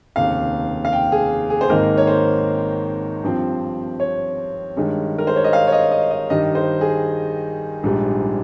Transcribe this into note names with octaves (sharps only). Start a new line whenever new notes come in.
F1 D#2 C#3 F5
F5
G5
G#4
G#4
C5
G#1 G#2 D#3 A#3 D#4 A#4
C#5
C5
G2 F3 C4
C#5
G2 D#3 G#3
A#4
C5
C#5
D#5
F5
C#5
D#5
D#5
D#5
G2 D#3 G3 D#5
C5
G#4
A#1 G#2 G3